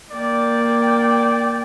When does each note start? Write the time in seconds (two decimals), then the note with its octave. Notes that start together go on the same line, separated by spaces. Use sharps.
0.11 A#3 D5 G5